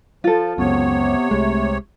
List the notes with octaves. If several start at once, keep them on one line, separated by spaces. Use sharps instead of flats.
F3 F4 A4
C#2 F#2 C3 B3 C#5
C2 G#3 A3